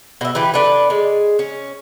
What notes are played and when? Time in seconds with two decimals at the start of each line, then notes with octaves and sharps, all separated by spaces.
0.21 B2 E5
0.35 E3 G4 B4
0.54 D4 A4 B4
0.90 G#3
1.39 C#4